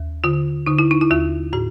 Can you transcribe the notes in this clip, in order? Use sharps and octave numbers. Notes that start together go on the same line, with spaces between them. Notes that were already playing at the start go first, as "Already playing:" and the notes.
Already playing: D#2
D3 F4
D3 D#4
E4
D#4
E4
D#2 F4
A2 F#4